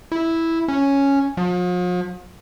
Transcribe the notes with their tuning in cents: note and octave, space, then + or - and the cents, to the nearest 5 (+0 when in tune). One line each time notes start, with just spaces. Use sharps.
E4 -5
C#4 +0
F3 +45